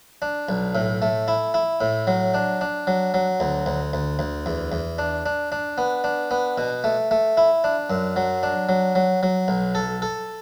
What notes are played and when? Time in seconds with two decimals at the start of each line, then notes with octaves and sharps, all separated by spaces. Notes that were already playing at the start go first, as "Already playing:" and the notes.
0.22 D4
0.49 B1
0.75 A2
1.02 A3
1.28 E4
1.54 E4
1.81 A2
2.07 F#3
2.34 D4
2.61 D4
2.87 F#3
3.14 F#3
3.40 D2
3.66 D2
3.93 D2
4.19 D2
4.46 E2
4.72 E2
4.99 D4
5.26 D4
5.52 D4
5.78 B3
6.04 D4
6.31 B3
6.58 B2
6.84 A3
7.11 A3
7.37 E4
7.64 D4
7.90 F#2
8.16 F#3
8.43 D4
8.69 F#3
8.95 F#3
9.23 F#3
9.48 B1
9.75 A4
10.02 A4